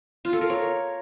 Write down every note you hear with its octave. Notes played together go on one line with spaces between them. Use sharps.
F4
A4
A#4
C#5